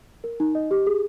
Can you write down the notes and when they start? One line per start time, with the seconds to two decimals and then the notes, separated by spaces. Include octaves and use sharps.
0.24 A#4
0.40 D#4
0.55 D#5
0.71 G4
0.87 G#4